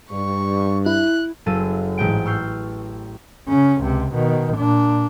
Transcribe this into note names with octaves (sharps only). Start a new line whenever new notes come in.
G2 C#6
E4 F#6
F#1 F#2 A4 F5 D#7
A1 G#2 G#3 G5 D7
C#6 E6 F6 G6 C7
C#3 C#4
C#2 C3
B2 D#3
A#2 D4